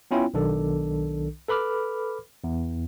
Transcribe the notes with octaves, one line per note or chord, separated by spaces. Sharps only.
B3 C#4 E4 F4 C#5 G5
B1 D#3 D4 A4
A4 B4 B5 D6 F6
E2